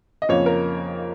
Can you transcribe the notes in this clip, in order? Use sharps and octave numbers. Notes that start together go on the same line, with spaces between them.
D#5
F2 C#3 F3 A#3 C#5
A#4